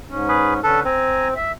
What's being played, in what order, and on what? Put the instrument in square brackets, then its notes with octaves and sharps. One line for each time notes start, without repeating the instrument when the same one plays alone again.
[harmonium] G#2 C#4
[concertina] G#4 B4
[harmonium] D3 C#4 B4 [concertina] A4
[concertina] C4 [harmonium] G#5 A#5
[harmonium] E5